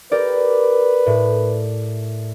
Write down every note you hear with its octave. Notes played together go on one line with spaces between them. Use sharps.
G4 A#4 B4 D5
A2